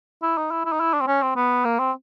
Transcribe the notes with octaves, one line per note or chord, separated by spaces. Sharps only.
E4
D#4
E4
E4
D#4
E4
D4
C4
C#4
C4
B3
A#3
C4